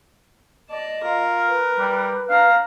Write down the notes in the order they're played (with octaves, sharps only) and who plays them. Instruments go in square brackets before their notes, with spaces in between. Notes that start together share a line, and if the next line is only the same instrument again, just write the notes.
[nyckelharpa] D5 A5 [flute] D#5
[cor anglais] F4 [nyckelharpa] A#4
[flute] B4
[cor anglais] G3
[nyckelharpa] D4 A#5 [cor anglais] F5